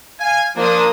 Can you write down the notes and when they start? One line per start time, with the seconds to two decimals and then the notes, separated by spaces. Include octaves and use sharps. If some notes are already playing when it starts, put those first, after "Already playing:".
0.20 F5 G#5
0.56 F3 A#3 D4 C5 D#6